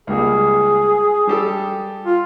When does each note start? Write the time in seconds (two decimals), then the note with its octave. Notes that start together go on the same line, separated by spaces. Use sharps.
0.07 C#2 G3 A#3 G#4
1.27 G3 G4 A4
2.05 F4